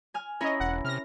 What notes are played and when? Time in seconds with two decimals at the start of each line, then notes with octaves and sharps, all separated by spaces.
0.14 G#5 F6
0.40 C#4 E4 A#4 C#5 D#5
0.60 E1 F#5
0.85 C3 F6 A#6